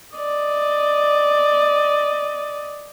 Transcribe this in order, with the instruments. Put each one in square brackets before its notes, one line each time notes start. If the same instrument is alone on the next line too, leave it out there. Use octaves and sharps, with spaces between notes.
[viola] D5 D#5